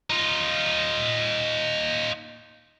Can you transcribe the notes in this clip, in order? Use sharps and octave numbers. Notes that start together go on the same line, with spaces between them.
D#4 F4